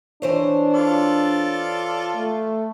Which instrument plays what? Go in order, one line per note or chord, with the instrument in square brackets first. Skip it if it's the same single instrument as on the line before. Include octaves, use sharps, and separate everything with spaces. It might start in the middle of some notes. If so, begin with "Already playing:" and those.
[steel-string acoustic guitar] E3 C5 C#5 [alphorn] D4
[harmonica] F4 A4 D5
[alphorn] A3